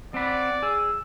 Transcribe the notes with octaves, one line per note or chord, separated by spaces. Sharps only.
C4 D5 F#5 B5
G#4 E6